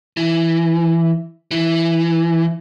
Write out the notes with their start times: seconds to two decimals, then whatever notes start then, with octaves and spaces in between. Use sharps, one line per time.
0.17 E3
1.51 E3